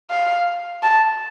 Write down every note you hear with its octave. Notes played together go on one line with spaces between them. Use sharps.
F5
A5